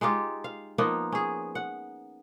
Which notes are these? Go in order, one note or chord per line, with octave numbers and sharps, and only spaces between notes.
G#3 D#4 F4 G4
F5
F3 A#3 B3 D#4
C#4 G#4
F#5